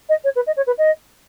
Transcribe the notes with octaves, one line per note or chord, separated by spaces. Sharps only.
D#5
C#5
B4
D#5
C#5
B4
D#5